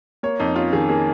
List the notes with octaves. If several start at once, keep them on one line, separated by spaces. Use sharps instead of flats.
A#3 C#5
F2 D#4
C#4 F4
D#3 G#4
A#3 G#4